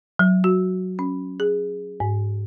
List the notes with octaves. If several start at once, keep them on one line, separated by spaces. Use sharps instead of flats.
F#3
F#4
C#4
G#4
G#2